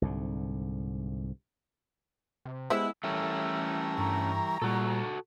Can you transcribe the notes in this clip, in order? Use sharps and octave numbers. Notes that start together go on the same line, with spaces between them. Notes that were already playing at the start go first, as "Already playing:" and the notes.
C2 G#2 D3
C3
G#3 B3 E4 G4 C5 E5
E3 G3 A3 C#4 A4 A#4
G2 A#5 C#6
A#2 G3 F#4 A4